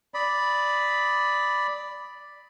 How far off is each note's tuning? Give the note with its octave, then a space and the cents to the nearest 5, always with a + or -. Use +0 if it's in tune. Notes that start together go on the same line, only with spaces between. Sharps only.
D5 +0 B5 +0 D#6 +20